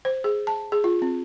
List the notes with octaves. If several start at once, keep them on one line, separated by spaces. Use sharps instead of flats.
C5
G#4
A5
G#4
F4
C4